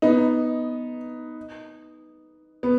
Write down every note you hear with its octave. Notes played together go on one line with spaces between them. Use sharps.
B3 D#4
B3